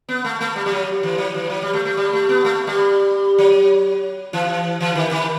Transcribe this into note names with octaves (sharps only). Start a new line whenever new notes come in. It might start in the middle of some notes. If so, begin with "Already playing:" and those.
B3
A3
A3
G3
G3
F#3
E3
F#3
E3
F#3
G3
A3
A3
G3
A3
B3
A3
G3
F#3
E3
E3
D#3
D#3